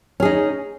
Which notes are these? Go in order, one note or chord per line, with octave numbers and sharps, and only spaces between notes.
C#4 D#4 G#4